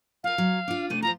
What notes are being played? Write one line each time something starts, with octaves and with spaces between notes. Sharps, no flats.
F4 A#4 F5
F#3
D4 F4
C3 A3 D4 D#7
F3 F4 C5 A#5